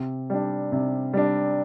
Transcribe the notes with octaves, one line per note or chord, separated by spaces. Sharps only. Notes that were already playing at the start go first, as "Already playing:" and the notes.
Already playing: C3
G3 D4
C3
G3 D4